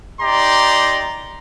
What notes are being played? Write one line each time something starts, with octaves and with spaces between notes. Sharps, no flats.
D#4 G4 D5 A#5 C6